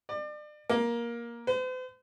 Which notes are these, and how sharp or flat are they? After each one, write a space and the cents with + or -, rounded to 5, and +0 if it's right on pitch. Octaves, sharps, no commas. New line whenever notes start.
D5 +35
A#3 +15
C5 -45